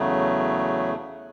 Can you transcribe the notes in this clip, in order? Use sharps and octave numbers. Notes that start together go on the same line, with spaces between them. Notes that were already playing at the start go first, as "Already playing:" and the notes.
Already playing: E2 C#3 F#3 A3